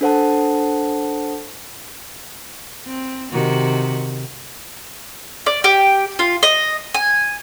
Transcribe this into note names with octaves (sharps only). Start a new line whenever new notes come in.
D4 A4 C5 F#5 A5
C4
C3 D#3 F#4
D5
G4
F4
D#5
G#5